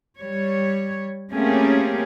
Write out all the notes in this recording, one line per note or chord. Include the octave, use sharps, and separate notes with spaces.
G3 C#5
A3 A#3 C4 C#4 G4 G#4